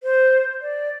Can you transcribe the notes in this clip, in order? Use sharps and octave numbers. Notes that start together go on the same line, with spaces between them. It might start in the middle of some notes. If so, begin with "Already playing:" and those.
C5
D5